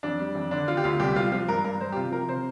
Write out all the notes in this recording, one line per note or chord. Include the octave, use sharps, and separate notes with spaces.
F2 D4
G3
F2
D3 D4
D3 F4
G4
D2 F4
C2 G4
C2 F4
F3 F4
G2 A#4
G2 A#4
G2 C5
G4
C3 F4
F3 A#4
C3 C5